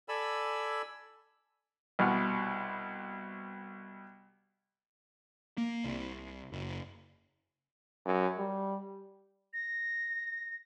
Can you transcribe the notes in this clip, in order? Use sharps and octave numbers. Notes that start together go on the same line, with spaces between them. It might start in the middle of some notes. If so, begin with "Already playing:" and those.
A4 D5 G#5 B5 E6
C2 B2 B3 F6
A#3
C2
F#1
F#2
G3
A#6